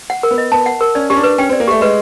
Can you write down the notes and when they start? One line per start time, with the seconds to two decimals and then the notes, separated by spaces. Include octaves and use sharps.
0.10 F#5
0.23 A#4
0.31 B3
0.38 D#5
0.52 B3 A5
0.66 F#5
0.81 A#4
0.95 C#4 D5
1.10 C#4 G4
1.16 D4
1.24 B4
1.38 C#4 G5
1.49 C4
1.53 D5
1.60 A#3
1.68 A3 G4
1.81 G#3 B4